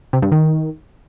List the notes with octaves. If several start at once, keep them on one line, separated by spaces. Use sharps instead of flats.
C3
G2
D#3